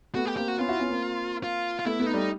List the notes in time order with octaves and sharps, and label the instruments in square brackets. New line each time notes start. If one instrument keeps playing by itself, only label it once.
[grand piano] A3 B3 [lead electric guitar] F#4
[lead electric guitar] G4
[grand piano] A#3 C4 [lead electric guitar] G4
[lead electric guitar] F#4
[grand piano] B3 C#4 [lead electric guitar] F4
[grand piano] E4 F#4
B3 C#4
A#3 C4
[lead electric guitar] F4
F4
[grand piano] A3 B3 [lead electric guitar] E4
[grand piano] A3 B3
[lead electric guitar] D#4
[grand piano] G3 A3